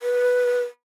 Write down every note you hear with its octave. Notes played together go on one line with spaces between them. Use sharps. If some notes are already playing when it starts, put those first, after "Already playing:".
B4